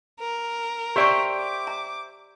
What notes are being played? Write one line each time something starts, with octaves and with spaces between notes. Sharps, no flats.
A#4
G4 C5 D5 E5 G5 C#6
D6
A#5